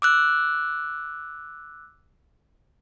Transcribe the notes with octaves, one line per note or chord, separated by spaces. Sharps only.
D6 E6 F#6